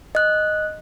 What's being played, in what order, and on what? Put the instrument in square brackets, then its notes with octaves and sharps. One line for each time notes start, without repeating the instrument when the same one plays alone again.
[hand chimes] D#5 F#6